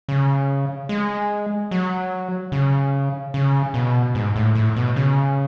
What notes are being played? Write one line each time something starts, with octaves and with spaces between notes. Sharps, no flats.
C#3
G#3
F#3
C#3
C#3
B2
G#2
A2
A2
B2
C#3